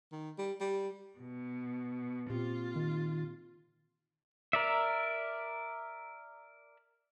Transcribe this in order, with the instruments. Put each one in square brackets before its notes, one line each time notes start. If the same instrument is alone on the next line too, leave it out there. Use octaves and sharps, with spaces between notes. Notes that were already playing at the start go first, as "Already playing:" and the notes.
[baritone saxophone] D#3
G3
G3
[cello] B2
[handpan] A#2 C4 G4 [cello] F4
[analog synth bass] D#3
[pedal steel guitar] A#4 D5 E5